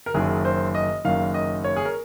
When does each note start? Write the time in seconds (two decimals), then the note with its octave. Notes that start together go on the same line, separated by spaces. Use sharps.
0.06 A#4
0.14 F#1 F#2 D#3 G#4
0.45 C5
0.75 D#5
1.05 F#1 F#2 D#3 F5
1.34 D#5
1.64 C#5
1.76 G#4
1.85 A#4